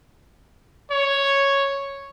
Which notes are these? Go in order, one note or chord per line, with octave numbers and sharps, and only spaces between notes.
C#5